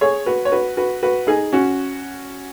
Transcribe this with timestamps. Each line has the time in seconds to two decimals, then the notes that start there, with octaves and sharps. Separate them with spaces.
0.01 G#4 C#5
0.26 F#4 B4
0.45 C#5
0.52 F#4 B4
0.77 F#4 B4
1.03 F#4 B4
1.27 D#4 G#4
1.53 C#4 F#4